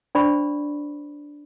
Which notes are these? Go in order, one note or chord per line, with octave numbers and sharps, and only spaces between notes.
D4 C5 D5 B5 C#6